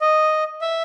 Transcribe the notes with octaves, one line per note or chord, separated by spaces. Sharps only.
D#5
E5